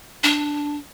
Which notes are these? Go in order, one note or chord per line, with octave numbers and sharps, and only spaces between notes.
D4